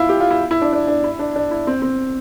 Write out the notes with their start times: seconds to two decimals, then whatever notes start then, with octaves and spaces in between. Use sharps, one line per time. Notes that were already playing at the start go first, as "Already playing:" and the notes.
Already playing: E4 F4
0.09 G4
0.20 F4
0.31 E4
0.51 E4
0.62 D4
0.73 D4
0.87 D4
1.04 E4
1.19 D4
1.36 D4
1.51 E4
1.67 C4
1.82 C4